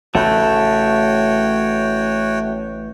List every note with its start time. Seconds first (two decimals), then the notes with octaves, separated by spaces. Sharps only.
0.15 A1 C#3 A3 F#4 C#5 G5